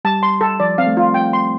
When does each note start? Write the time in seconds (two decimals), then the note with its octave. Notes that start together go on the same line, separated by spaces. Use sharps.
0.05 G3 A5
0.23 C6
0.41 A4
0.60 F3 D5
0.78 C4 F5
0.87 A3
0.97 F4
1.14 G5
1.33 C6